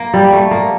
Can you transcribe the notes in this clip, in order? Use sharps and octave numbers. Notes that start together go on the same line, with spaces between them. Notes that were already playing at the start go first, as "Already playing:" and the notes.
Already playing: A#3
G3
A3
A#3